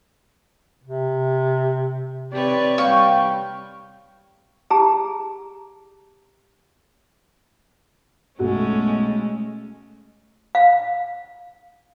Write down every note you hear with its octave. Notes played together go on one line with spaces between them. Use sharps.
C3
C3 G4 B4 C#5 D5
G3 A#3 G5 C#6
G4 G#4 A5 A#5
B1 G#3 A3 C#4 F#4
F5